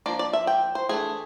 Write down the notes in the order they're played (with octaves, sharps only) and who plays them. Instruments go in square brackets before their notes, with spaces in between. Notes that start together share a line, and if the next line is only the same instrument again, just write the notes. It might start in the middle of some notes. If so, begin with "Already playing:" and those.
[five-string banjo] F3 A#3 D4 D5
D5
E5
G5
C5
E3 A3 D4 G#4